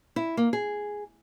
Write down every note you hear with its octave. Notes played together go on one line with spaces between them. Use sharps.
E4
A#3
G#4